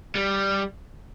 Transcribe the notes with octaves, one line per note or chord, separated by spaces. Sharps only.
G3